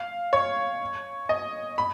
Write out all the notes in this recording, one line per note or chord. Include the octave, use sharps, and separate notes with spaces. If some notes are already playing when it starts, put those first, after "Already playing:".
Already playing: F5
C#5
D#5
B5